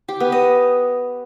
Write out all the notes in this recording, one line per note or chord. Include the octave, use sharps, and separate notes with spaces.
G4
B3
D#5